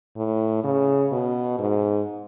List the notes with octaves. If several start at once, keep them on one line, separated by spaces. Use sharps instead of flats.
A2
C#3
B2
G#2